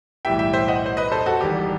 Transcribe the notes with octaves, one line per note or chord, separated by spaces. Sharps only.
B1 A2 E3 G3 E5 G5
E5 G5
C5 E5
D#5 F#5
C5
B4 D#5
A4 C5
F#4 A4
E1 E2 D#3 G3 G4